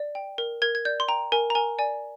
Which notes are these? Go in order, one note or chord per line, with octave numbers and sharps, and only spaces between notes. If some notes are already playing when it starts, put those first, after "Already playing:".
Already playing: D5
G5
A#4
A#4 G#6
G#6
D5 G6
C6
G5 A#5
A#4 G#5
A#5
A#4 G#5
D5 G#5